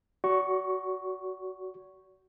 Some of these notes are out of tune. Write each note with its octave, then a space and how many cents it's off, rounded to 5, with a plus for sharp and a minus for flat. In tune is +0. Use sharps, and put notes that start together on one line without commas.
F#4 +20 D5 -45 C#6 +0